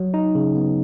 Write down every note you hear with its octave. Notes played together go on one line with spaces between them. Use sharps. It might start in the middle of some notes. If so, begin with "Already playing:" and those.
Already playing: F#3
D#4
C#3
B3